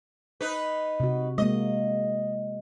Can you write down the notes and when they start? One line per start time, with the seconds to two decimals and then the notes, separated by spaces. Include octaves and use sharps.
0.41 D#4 B4
1.00 C3 F#4
1.38 G#3 A#3 D#5